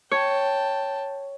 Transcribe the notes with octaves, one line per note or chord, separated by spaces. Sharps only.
C#5 G5 A5